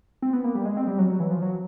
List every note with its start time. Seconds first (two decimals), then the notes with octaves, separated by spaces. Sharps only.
0.22 C4
0.33 B3
0.44 A#3
0.55 G3
0.65 G#3
0.77 C4
0.88 G3
0.99 F#3
1.10 F#3
1.20 E3
1.31 F3
1.42 F#3